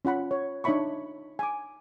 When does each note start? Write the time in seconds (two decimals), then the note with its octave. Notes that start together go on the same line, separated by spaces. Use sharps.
0.05 C#4 F4 F#5 B5
0.31 C#5
0.64 D4 D#4 C#5 E5 B5 C#6
1.39 G#5 D6